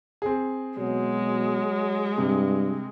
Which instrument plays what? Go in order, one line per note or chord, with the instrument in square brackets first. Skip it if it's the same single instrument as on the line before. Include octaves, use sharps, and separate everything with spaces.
[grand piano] C4 G#4
[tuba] B2 [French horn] F#3 [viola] G#3
[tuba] G2 [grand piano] C3